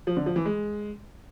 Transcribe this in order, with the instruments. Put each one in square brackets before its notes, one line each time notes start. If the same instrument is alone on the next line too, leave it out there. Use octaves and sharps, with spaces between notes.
[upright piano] F3
D3
F3
E3
G#3